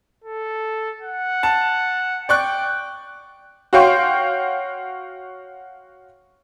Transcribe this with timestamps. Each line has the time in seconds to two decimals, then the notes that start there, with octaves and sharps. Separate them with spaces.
0.24 A4
1.02 F#5
1.43 A5
2.29 D5 G5 C#6 F#6
3.73 F#4 C#5 F5 G5 C6 C#6